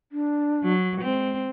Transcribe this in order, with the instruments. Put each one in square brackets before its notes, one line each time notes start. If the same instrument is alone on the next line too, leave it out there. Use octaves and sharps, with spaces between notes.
[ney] D4
[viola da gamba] F#3
[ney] G#3 [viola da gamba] C4